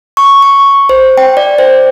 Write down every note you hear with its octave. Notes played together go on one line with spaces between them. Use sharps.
C#6
C#6
C5
G5
D5
C5